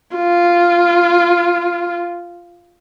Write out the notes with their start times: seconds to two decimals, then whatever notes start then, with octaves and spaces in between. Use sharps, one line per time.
0.16 F4